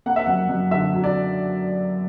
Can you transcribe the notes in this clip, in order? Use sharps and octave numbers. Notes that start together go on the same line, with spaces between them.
A#3 F#5
E5
F#2 F#5
F#2
D3 E5
F#3
D5